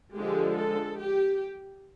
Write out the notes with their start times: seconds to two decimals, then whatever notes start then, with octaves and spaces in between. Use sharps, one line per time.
0.15 D3 F3 G#3 G4
0.56 A4
0.98 G4